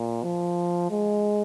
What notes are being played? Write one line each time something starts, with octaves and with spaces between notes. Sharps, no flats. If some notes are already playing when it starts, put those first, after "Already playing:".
Already playing: A#2
F3
G#3